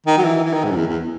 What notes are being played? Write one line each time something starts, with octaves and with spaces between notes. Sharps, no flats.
D#3
F#3
E3
E3
D#3
G#2
F#2
E2
E2